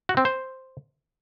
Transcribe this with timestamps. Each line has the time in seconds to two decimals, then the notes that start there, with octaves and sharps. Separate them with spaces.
0.09 F#4
0.17 C4
0.25 C5